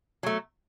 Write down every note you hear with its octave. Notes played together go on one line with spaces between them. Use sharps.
F#3 A3